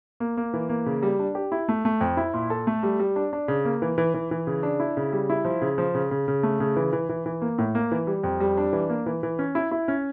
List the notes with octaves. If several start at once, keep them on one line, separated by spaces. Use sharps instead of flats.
A#3
A#3
E3
A#3
C#3
G3
D4
G4
E4
A3
A3
F2
E4
A#2
A4
A3
G3
G3
D4
D4
C#3
A#3
E3
E3
E3
E3
C#3
D4
E4
C#3
G3
E4
F3
C#3
F3
C#3
C#3
C#3
A3
C#3
E3
E3
E3
E3
A#3
A2
A#3
E3
G3
F2
G3
D4
E3
A#3
E3
E3
C#4
E4
E4
C#4